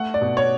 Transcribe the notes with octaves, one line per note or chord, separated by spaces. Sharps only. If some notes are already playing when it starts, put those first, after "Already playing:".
Already playing: A3 F#5
D5
B2
C#5